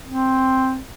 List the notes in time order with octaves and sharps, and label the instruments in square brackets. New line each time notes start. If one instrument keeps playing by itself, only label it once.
[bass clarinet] C4